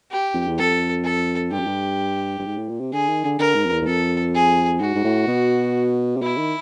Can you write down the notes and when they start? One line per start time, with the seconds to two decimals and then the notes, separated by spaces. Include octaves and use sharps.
0.11 G4
0.34 F2
0.47 E2
0.58 F2 A4
1.04 A4
1.52 G2 G4
1.60 F#2
1.67 G2
2.38 G2
2.45 G#2
2.57 A2
2.69 A#2
2.80 C3
2.92 D3 G#4
3.09 D#3
3.24 D3
3.39 D3 A#4
3.55 G#2
3.66 F2
3.71 E2
3.82 E2
3.86 F2 A4
4.34 G#4
4.80 G#2 F#4
4.95 G#2
5.04 A2
5.27 B2
6.17 C3
6.22 B2 E4
6.37 D#3